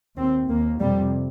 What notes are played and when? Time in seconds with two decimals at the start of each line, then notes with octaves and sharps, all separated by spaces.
0.17 D#2 C4
0.48 D#2 A#3
0.80 F2 C3 G3